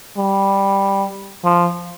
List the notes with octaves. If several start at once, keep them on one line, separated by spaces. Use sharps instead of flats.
G3
F3